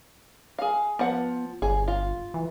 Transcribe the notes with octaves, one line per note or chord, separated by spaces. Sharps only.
G#4 F5
F3 B3 F#5
G1 G#4
F4
E3